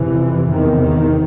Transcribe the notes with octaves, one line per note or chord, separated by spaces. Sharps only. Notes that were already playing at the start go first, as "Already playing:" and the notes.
Already playing: F2 C3 E3
E2 C3 D#3
D#3